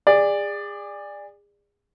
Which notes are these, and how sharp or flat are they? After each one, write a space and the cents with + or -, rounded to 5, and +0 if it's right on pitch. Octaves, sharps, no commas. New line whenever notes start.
G#4 -30 D5 +10